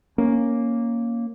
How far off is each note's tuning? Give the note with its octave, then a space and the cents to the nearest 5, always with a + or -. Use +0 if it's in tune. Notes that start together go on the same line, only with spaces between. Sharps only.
A#3 +0 C#4 +0